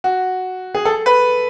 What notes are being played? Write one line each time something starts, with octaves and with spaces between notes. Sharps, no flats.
F#4
G#4
A4
B4